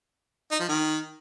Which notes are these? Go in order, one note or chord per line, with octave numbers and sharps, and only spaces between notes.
D#4
F3
D#3